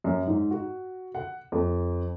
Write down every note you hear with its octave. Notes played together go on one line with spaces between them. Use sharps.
F#2
G#2
F#4
F#5
F2